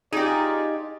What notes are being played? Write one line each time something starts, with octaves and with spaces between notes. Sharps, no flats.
D#4 F4 G4 G#4 D5